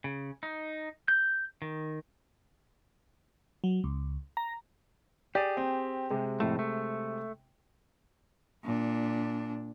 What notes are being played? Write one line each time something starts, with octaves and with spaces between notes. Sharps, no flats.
C#3
D#4
G6
D#3
F#3
C#2
A#5
G4 G#4 D5
C4
C3 G#3
F2 A2 A3
A3
A#2 D4